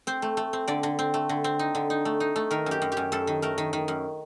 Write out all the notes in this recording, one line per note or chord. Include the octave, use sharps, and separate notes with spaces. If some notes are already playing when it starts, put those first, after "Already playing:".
C4 C5
A3
A3
C4
D3 D5
D3
C4
A3
D3
C4
D#4
D3
D#4
A3
D#4
A3
D#3 A#4
F#2 G4
F#2
G4
F#2
F#2 A4
D#3
A3 A#4
D#3
D#3
F#2